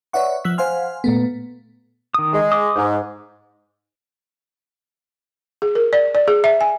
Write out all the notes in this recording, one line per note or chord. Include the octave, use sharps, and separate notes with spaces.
B4 C#5 D5 E5 F#5 C#6
F3 E6 F#6 B6
C5 F5 F#5 G#5 C6 F6
A#2 A3 B3
D#3 D#6
G#3
D6 D#6
G#2
G#4
A#4
D5
D5
G#4
E5
G#5